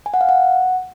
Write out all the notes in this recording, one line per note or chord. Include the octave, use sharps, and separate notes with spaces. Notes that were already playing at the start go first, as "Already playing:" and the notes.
G#5
F#5
F5
F#5